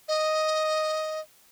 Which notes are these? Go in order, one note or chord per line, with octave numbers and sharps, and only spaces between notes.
D#5